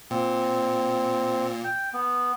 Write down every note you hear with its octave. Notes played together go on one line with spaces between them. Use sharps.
A#2 C4
G5
B3